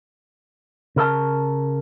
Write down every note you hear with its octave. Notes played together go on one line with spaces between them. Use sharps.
C#3 A#4 E5 A5